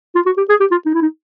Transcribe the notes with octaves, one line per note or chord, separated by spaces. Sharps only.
F4
F#4
G4
G#4
G4
F4
D#4
E4
D#4